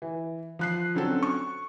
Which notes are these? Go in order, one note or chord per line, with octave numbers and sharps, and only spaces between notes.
E3
F3 F#6 C7
D3 F#3 C4 C#4 A4
C#6